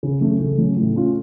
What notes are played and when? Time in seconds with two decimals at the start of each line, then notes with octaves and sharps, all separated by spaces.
0.03 C#3
0.21 F#3 A3 C#4
0.40 C#3
0.58 F#3 A3 C#4
0.76 A2
0.95 A3 C#4 F4